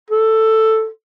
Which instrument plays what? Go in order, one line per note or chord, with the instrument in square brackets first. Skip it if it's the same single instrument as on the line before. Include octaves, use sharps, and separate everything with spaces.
[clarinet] A4